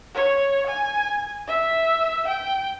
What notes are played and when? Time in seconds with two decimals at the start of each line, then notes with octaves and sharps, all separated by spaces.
0.15 C#5
0.67 G#5
1.47 E5
2.28 G5